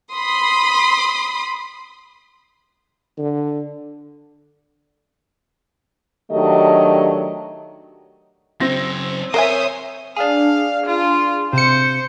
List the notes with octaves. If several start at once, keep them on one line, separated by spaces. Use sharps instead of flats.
B5 C6 D#6
D3
D#3 F#3 A3 D4 G4 D#5
C#3 F#3 C4 A#6
A#4 C5 C#5 E5 F#5 G#5 D#6
D4 G#4 F5
F4
C3 C5 C#7